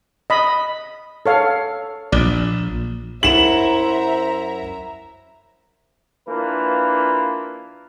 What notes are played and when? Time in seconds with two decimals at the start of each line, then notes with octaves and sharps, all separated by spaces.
0.30 D#5 B5
1.26 A4 C#5 F5
2.12 A#1 D5
3.23 F#2 E4 C5 E5 F#5 A#5 E7 F#7
6.29 E3 A#3 D4 F4 B4